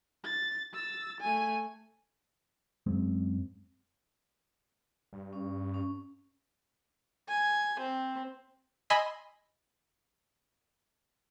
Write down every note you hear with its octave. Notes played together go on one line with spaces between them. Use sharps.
A6
E6 A6
A3 G#5
F#2 G#3 C4
G2
C#4
C#4
G#5
C4
D#5 G#5 B5 C6 E6